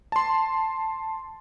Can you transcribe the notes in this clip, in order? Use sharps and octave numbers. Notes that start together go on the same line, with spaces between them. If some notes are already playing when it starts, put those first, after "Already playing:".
A5 C6